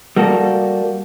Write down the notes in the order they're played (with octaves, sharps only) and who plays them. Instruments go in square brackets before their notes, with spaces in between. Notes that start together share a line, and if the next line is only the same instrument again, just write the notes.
[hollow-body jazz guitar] G3 A#3 F#4 A4